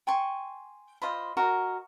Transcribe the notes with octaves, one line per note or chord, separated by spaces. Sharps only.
G5 G#5 C6 C#6
F4 C5 D#5 B5
F#4 A#4 D#5